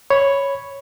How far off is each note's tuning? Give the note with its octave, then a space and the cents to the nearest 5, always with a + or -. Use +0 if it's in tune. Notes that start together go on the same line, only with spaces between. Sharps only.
C#5 +0 B5 +0